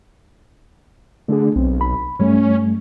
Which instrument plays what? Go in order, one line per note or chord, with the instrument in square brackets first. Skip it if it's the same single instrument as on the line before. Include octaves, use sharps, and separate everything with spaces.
[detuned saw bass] D3 [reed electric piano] A3 D4 G#4
[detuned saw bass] B1 [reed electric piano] C4
[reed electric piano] B5
[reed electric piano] G2 G3 A3 [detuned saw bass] C#4